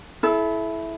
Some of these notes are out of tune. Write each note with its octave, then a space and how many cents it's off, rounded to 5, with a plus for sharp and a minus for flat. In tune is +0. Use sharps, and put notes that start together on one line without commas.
E4 +0 A4 -35